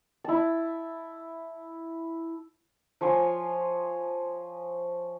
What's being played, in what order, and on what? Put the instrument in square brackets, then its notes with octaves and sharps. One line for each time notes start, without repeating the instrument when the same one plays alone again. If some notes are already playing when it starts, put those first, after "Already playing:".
[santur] E4 A5
F3 C#5 G#5 C6